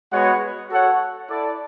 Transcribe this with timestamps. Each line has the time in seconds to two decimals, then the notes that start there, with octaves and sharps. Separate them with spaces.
0.12 G#3 B3 F#4 C#5 F#5
0.70 F#4 A4 C#5 F#5
1.29 E4 A4 D5